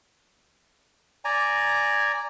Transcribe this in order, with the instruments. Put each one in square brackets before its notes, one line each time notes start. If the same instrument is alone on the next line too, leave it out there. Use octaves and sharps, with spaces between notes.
[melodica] D5 G#5 A#5